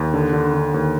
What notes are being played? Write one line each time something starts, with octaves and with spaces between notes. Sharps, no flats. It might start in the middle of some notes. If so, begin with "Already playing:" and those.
Already playing: D#2
D3
D3
D3
D#2